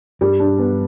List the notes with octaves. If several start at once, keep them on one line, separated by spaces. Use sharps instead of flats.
G2 G3
D4
B3